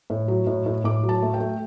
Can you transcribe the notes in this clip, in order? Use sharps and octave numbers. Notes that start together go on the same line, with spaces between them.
A2
F#3
A2
A2
A2 D6
F#3
A5
A3
G5
A3